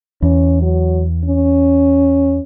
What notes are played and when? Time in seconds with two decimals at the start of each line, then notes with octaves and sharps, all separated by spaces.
0.22 E2 C#4
0.62 F#3
1.25 C#4